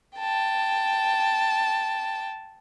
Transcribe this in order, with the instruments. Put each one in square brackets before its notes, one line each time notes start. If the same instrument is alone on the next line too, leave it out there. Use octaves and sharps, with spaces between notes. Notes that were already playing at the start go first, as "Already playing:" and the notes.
[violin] G5 A5